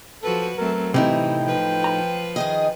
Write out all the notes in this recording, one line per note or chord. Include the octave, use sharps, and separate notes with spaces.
F3 F#4 A4 B4
F#3 A3 C4 A#4
A2 C3 E3 C4 D#4 E4 G5
F3 B4
A#5
D#3 G#4 D#5 G5